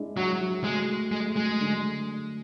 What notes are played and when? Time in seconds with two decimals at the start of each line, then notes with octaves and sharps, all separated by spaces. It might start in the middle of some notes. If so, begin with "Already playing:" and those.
Already playing: G#3 D4 E4
0.17 F#3 F#4
0.41 F#4
0.64 G#3 A3
0.89 A3
1.12 G#3 A3
1.36 F#3 G#3
1.60 D3